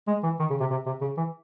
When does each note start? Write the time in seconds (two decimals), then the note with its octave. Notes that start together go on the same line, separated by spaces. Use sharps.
0.08 G#3
0.23 E3
0.40 D#3
0.50 C#3
0.60 C3
0.70 C3
0.86 C3
1.01 C#3
1.17 E3